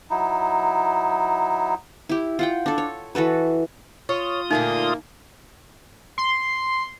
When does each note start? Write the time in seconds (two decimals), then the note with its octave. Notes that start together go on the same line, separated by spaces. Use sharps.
0.10 F#3 D#4 E4
2.09 E4 G4
2.39 F4 F#5 G5
2.66 D4 A4
2.78 C#5
3.15 E3 F#4 A4 B4
4.09 F4 C#5 D#6
4.51 A#2 D3 A3 A#3 D#4
6.18 C6